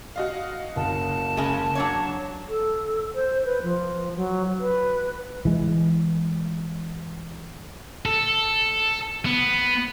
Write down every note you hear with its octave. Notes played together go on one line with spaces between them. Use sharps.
F#4 D#5 F5
F#1 A5
C#3 G#3
F#3 D4 C#5
A4
C5
B4
F3
F#3
B4
E3 G#3
A4
B3